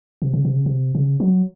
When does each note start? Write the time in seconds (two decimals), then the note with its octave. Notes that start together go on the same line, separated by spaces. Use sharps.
0.22 C3
0.33 C#3
0.45 C3
0.56 C#3
0.66 C3
0.95 C#3
1.20 F#3